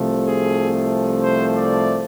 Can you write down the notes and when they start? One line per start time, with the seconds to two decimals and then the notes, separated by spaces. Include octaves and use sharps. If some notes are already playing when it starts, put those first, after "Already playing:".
Already playing: C2 C3 F3 A3
0.27 G#4
1.23 C5
1.55 D5